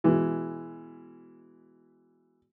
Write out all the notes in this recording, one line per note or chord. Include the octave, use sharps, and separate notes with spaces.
B2 E3 G#3